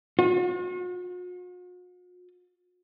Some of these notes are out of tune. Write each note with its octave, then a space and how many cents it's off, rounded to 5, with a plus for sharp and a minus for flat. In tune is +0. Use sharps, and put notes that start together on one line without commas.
F#4 -45